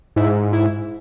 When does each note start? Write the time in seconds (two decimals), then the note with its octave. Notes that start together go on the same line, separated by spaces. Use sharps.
0.16 G#2 E4
0.53 E4